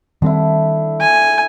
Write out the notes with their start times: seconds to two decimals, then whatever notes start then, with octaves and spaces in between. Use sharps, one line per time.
0.22 D3 D#3 G3 C4 E4
1.01 G#5